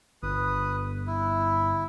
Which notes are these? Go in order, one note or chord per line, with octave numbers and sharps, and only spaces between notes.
G1 B4 D#6
E4